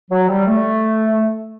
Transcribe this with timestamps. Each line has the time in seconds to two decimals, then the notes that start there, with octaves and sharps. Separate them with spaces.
0.11 F#3
0.29 G3
0.48 A3